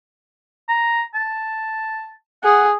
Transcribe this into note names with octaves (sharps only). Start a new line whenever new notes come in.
A#5
A5
G#4 F#5